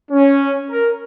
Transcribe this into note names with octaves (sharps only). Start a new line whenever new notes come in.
C#4
A#4